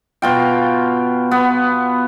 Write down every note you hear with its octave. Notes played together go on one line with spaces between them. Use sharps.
B2 F4 G5
B3